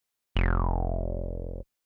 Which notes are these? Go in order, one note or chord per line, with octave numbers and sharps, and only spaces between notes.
F1